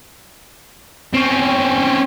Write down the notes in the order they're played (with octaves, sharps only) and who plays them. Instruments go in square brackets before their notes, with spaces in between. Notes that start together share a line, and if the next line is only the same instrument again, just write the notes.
[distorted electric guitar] C4 C#4